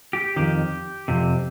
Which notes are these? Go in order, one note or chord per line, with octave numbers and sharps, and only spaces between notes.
G4
F2 D#3 G4
F2 C3